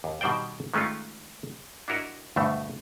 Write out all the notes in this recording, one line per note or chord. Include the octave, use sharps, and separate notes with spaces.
D#2
B2 D#3 G3 C5 D5 G5
D#3 G#3 A3 C#4 F4
D4 E4 F#4 A#4 D#5
D2 G2 B2 A3